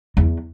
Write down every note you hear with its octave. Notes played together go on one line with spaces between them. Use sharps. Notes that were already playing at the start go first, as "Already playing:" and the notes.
E2